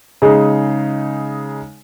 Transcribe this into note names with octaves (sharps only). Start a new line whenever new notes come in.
C#3 G#3 D#4